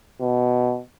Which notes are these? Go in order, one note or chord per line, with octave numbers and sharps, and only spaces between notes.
B2